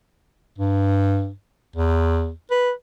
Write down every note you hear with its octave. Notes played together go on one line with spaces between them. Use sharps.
G2
E2
B4